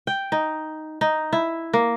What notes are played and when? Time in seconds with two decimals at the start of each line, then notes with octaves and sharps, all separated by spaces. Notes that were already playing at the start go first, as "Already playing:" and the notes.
0.07 G5
0.32 D#4
1.01 D#4
1.33 E4
1.73 A#3